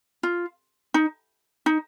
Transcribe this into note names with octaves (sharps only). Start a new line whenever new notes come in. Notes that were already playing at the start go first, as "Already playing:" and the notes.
F4
D#4
D#4